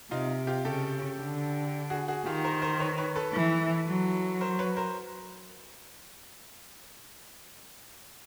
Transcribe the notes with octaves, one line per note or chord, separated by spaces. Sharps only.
C3 D#4 F4
F4 G4
C#3 G4 A4
D3
F#4 G#4
F#4 G#4
D#3 F4 G4
A#4 C5
A#4 C5
B4 C#5
B4 C#5
A4 B4
E3
F#3
A#4 C5
B4 C#5
A#4 C5